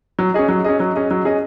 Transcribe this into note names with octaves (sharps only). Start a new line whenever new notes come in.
F#3
C#4 G#4 D#5
F#3
C#4 G#4 D#5
F#3
C#4 G#4 D#5
F#3
C#4 G#4 D#5